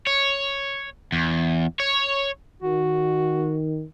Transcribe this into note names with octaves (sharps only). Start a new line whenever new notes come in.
C#5
E2
C#5
D#3 F#4